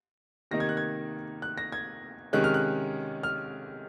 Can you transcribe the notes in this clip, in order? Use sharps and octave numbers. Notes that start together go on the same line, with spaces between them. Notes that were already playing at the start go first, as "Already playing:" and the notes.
C3 D#3 A#3 D#4 A#6
G#6
F#6
G#6
F#6
A#6
G#6
C3 D#3 G#3 C#4 F#6
F6
F#6
F6